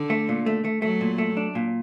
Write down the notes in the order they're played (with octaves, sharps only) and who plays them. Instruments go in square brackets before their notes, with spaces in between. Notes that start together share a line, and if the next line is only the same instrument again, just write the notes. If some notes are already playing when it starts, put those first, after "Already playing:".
Already playing: [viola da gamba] D3
[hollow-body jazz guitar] A3
A#2
A3
A3
[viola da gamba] F#3 [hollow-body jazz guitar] A3
[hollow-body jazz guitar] A#2
A3
D4
A#2